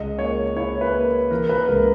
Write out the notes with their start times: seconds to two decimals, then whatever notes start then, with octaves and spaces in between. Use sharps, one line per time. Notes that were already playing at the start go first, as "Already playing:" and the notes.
Already playing: C#2 D#5
0.19 A#3 C#5
0.56 E4 C#5
0.81 B4
0.93 A#3
1.30 E3 A#4
1.49 B4
1.68 C#2 A#4